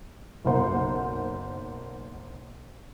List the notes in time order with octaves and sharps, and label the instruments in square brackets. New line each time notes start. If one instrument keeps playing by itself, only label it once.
[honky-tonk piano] F#1 B1 A#4 C5 F#5